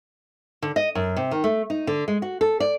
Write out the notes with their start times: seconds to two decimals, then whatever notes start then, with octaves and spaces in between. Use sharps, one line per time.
0.62 D3
0.76 D#5
0.95 F#2
1.17 C3
1.31 D#3
1.44 A3
1.70 D#4
1.87 D3
2.08 G#3
2.22 F#4
2.41 A4
2.60 D5